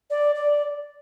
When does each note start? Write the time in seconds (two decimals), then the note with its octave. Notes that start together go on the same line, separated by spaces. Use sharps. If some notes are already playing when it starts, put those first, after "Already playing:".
0.10 D5
0.35 D5